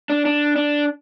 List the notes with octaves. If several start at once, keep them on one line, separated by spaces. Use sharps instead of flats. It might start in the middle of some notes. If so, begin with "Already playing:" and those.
D4
D4
D4